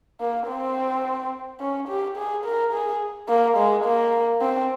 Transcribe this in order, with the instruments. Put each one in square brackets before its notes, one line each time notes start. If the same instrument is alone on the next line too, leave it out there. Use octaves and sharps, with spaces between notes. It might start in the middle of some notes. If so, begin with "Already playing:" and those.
[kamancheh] A#3
C4
C#4
G4
G#4
A#4
G#4
A#3
G#3
A#3
C4